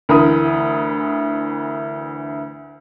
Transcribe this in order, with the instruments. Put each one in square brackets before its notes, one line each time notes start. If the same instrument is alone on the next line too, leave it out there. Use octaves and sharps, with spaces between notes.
[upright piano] D2 E3 A#4 B5 D#6